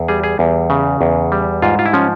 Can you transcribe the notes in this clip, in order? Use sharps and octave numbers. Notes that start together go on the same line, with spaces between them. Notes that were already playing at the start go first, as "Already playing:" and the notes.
Already playing: E2
G3 G#4
G#4
E2
C#3
E2
G3
G#2 F4
F4
E4
F3 C#4